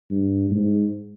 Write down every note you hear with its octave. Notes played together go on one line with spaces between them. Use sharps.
G2
G#2